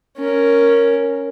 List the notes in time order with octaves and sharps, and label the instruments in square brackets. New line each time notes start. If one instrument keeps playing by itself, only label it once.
[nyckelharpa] C#4 A#4